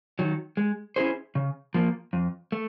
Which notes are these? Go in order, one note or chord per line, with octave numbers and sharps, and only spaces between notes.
D#3 F#3
G#3
C#4 E4 G#4 C5
C#3
F3 A#3
F2
A3